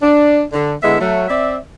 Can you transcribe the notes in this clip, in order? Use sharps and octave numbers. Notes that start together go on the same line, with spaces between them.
D4
D3
D3 G#3 B3 E4 E5
F#3 A3
C4 D5 E5